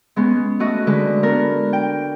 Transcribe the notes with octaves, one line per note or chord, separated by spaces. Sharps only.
G#3 B3 C#4
A3 F#4 D#5
D3 G#3 B4
B3 D4 A#4
G5